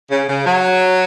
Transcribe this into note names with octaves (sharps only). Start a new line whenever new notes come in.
C#3
C#3
F#3